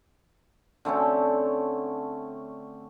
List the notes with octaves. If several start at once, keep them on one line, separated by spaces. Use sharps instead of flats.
D3 A3 C4 C#4